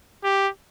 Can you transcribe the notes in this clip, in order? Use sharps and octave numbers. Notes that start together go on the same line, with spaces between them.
G4